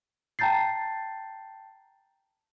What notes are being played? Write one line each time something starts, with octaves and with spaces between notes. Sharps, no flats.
G5 A5 A#5 G6 A6 C7